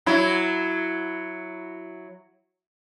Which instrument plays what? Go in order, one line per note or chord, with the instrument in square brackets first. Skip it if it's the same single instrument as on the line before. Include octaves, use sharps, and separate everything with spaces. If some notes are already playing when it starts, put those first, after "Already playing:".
[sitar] F#3 E4